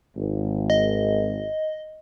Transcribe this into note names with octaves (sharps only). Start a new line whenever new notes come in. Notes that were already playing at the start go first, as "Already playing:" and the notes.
G#1
D#5